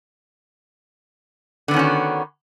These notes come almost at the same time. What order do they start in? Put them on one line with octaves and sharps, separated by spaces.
D3 B3 D#3 C#4 F#4